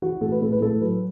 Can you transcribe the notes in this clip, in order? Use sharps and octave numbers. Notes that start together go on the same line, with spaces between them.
E3 F#4
A2 A4
B4
A2 A4
B4
A2 A4
F#3 B4